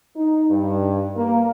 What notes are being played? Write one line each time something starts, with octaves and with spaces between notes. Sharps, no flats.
D#4
G2
A#3